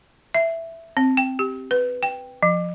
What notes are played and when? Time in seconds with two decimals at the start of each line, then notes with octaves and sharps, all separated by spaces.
0.35 E5
0.97 C4
1.17 G5
1.39 G4
1.71 B4
2.03 G5
2.43 F3